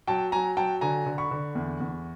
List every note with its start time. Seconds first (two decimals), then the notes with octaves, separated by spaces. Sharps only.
0.08 F#3 G5 A5
0.32 F#3 G#5 A#5
0.57 F#3 G5 A5
0.81 D3 G#5 A#5
1.06 D3
1.18 B5 C#6
1.31 D3
1.55 E2
1.80 E2